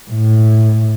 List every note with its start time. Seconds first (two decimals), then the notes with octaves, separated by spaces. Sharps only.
0.11 A2